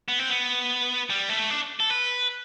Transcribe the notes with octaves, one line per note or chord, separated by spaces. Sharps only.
B3
C4
B3
G3
A3
D4
A4
B4